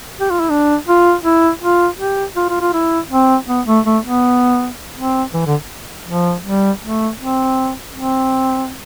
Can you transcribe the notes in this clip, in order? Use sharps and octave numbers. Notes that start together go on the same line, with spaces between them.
G4
F4
E4
D4
F4
E4
F4
G4
F4
F4
F4
E4
C4
B3
A3
A3
B3
C4
E3
D3
F3
G3
A3
C4
C4